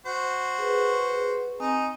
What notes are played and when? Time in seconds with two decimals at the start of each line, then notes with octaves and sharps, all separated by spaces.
0.06 F#4 C5
0.59 G#4 B4
1.60 C4 D#4 G#5 D#6